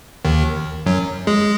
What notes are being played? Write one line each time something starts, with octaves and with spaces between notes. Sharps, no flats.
D#2 D#3
F#2 F#3
G#3 G#4